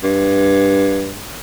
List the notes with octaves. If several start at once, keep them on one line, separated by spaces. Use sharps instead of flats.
G2